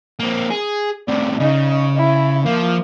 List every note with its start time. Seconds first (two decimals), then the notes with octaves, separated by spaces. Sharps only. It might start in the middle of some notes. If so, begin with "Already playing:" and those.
0.19 A#3 C4
0.50 G#4
1.08 A2 C3 D5
1.41 C#3 D#4
1.96 E4
2.46 F3 A#3